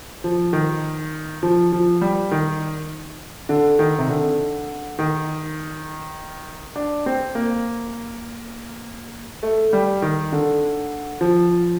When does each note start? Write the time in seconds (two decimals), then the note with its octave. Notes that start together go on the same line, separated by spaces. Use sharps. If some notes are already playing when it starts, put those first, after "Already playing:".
0.24 F3
0.53 D#3
1.43 F3
1.72 F3
2.01 G3
2.31 D#3
3.49 D3
3.79 D#3
3.99 C3
4.10 D3
4.99 D#3
6.76 D4
7.06 C4
7.35 A#3
9.43 A3
9.73 G3
10.02 D#3
10.32 D3
11.21 F3